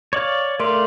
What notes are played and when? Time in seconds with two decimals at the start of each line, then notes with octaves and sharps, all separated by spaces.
0.13 C#5 D5 F5
0.60 A3 A#4 D5 F5 C6